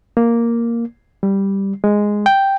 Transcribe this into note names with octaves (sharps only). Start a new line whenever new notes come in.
A#3
G3
G#3
G5